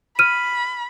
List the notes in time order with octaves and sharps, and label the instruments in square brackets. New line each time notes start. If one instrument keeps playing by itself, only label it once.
[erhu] B5 [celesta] F6 D#7